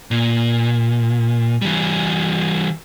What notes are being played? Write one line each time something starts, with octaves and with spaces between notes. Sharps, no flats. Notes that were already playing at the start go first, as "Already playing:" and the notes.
A#2
E3 G3